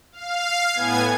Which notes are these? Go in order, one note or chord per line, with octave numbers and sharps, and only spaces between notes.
F5
A2 B3 G#5 G#6